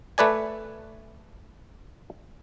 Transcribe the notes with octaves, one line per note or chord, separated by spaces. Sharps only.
A3 B4 D5 G#5